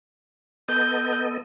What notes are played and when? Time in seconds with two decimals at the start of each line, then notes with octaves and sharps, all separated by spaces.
0.68 B3 A4 D#5 G6